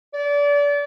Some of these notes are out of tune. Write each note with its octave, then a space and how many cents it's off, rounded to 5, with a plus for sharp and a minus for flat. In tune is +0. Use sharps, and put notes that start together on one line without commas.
D5 -30